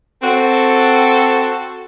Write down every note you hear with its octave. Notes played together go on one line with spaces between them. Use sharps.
C4 F#4 A4